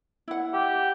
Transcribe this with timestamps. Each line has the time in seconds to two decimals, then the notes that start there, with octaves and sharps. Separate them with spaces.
0.28 E4 F#5
0.53 G4